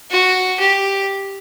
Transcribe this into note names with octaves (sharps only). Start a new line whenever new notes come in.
F#4
G4